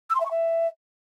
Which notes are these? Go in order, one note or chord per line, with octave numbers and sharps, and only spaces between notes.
E6
C6
E5
C#6
E5